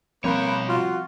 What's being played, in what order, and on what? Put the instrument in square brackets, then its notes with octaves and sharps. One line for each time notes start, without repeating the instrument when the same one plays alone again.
[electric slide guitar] B2 C#5 [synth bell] F3 G3 C4 [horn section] A#3 B4
[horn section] F4 F#4